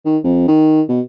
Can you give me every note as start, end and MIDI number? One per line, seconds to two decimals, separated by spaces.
0.06 0.18 51
0.24 0.44 41
0.48 0.82 51
0.89 1.01 47